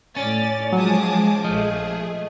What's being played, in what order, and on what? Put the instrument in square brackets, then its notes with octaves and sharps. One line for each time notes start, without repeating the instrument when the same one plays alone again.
[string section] A2 D5 A6 [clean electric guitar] C#4
[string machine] F3 G#3 D6 [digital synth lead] F#3 [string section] G#5 A5 D#6
[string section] A#1 A3 [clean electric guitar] F3 [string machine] G#4 [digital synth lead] D#5